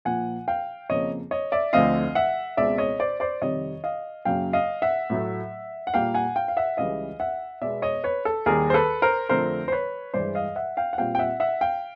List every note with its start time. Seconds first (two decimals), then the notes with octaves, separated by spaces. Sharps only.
0.05 A#2 F3 A#3 F#5 G#5
0.48 F5 G5
0.89 F2 C#3 F3 A#3 C#5 D#5
1.31 C#5 D#5
1.52 D5 E5
1.73 D2 D3 F3 A3 C4 D#5 F5
2.15 E5 F#5
2.57 C#2 B2 G#3 C4 D5 E5
2.78 C#5 D#5
3.00 C5 D5
3.20 C5 D5
3.41 F2 C3 D#3 G3 C#5 D#5
3.84 D#5 F5
4.25 F#2 C#3 F#3 A#3 F5 G5
4.53 D#5 F5
4.82 E5 F#5
5.10 A2 F#3 A3
5.87 F#5
5.94 A#2 G3 A#3 F5 G5
6.14 F#5 G#5
6.36 F5 G5
6.48 F5
6.57 E5 F#5
6.77 C#2 C#3 E3 G3 D#5 F5
7.20 E5 F#5
7.61 B2 G#3 B3 D5 E5
7.82 C#5 D#5
8.04 B4 C#5
8.25 A4
8.46 D#2 D#3 G3 G#4 A#4
8.70 C5
8.74 A4 B4
9.02 A#4 C5
9.29 F2 D3 F3 A3 C4 A#4 C5
9.68 C5
9.72 B4 C#5
10.14 G2 E3 G#3 C5 D5
10.35 D#5 F5
10.56 E5 F#5
10.77 F5 G5
10.93 F#5
10.98 A#2 G3 C4 F5 G5
11.15 G5
11.19 E5 F#5
11.40 E5 F#5
11.61 F5 G5